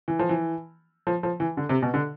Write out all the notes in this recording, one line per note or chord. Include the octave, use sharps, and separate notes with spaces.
E3
F3
E3
F3
F3
E3
D3
C3
B2
D3